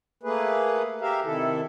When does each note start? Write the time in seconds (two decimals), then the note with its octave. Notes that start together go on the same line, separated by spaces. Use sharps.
0.23 A3 A#3 G#4 B4
1.01 G4 A#4 E5 F5
1.24 C3 D#3 E4 A4